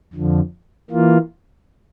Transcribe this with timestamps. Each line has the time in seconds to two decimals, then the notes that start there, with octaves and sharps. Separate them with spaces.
0.13 F2 D3 F3
0.91 E3 A#3 F4